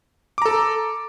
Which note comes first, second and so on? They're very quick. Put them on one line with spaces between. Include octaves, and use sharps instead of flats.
D6 A#5 A4